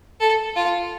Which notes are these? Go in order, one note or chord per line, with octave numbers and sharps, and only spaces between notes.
A4
F4